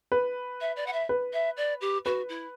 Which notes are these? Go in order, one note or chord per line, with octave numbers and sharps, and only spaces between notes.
B4
E5
D5
F#5
E5
B4
E5
D5
G4
F#4 B4
E4